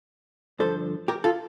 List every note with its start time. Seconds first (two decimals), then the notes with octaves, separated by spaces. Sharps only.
0.59 G2 D3 F3 A4 C5
1.08 G4 A#4
1.24 F4 A4